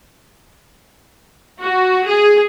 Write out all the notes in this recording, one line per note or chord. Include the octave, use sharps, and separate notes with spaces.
F#4
G#4